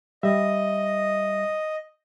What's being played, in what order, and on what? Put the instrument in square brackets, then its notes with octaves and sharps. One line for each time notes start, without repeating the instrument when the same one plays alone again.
[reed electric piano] G3 E5 [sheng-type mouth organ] D#5